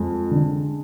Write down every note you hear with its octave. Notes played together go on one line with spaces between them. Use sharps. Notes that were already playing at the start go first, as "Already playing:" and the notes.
Already playing: F2 G#3
D3